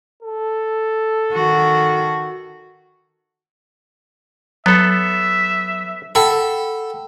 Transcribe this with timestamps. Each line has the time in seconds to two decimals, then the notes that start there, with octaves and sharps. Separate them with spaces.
0.23 A4
1.33 D#3 F#4
4.66 F#3 B3 A4 E5
6.15 A4 F#5 G5 B5